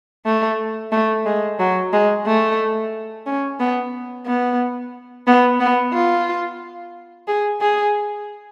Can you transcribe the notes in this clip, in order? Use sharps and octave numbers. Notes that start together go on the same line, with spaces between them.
A3
A3
G#3
F#3
G#3
A3
C#4
B3
B3
B3
B3
F4
G#4
G#4